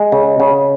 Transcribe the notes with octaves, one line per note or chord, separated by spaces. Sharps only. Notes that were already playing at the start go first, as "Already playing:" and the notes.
Already playing: G#3
C#3
C#3